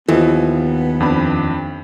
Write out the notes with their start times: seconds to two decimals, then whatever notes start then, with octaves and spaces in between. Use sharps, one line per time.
0.08 D#2 E3 F3 B3
1.00 F2 D4 B5